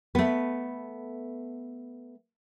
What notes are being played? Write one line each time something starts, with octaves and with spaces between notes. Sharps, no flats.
A3 B3